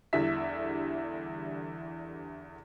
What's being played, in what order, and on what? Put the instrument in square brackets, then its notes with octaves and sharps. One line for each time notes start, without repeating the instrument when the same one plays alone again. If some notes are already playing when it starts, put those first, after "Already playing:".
[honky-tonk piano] E2 D3 E3 G3 E5 B6